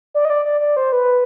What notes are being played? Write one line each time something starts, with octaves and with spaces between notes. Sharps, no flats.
D5
D#5
D5
D5
D5
C5
B4